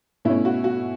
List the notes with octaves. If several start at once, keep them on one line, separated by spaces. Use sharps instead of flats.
B2 A3 C#4 E4
F#4
F#4